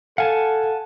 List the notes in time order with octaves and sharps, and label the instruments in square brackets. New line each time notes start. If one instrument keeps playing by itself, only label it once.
[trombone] A4 [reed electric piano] F5 [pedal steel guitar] F#5 G#5 A5